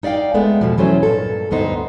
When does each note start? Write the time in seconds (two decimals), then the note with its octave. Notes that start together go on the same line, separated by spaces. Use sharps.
0.03 D#4 D5 E5 F5 G5
0.34 G#3 A3 B3
0.61 F2 B2 F3
0.78 E3 F#3 A3 C#4 C5
1.03 G2 A#2 A4
1.51 D2 G2 B3 D#4 C5